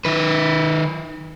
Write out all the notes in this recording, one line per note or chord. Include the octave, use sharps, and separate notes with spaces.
D#3 B4